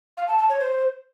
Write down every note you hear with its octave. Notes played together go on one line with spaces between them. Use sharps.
F5
A5
A5
C#5
C5